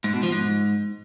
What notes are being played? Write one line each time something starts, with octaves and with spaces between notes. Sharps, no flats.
G#2
B2
F3
G#2